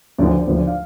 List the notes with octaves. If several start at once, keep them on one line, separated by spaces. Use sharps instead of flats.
D2 D3 F3 D5
C5
D5
D2 D3 F3 C5
D5
F5